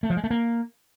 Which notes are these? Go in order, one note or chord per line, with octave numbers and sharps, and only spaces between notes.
A3
F3
G#3
A3
A#3